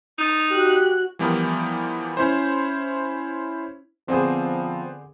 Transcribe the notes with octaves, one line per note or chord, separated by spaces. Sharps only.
D#4 A6 F7
F#4 G4 F#6
E3 F3 G3 B3 G4 A#4
C#4 E4 C5
D3 F3 B3 C4 G#4 C5